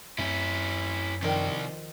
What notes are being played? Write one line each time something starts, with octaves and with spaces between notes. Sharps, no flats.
F#2 C4 C#4 E4
C3 D#3 F3 D5